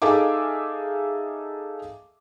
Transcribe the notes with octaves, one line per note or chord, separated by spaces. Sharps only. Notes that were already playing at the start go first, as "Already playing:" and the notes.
D#4 G#4 A4 E5 F5 D6